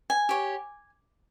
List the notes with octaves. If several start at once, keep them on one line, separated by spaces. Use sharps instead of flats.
G#5
G4 C#5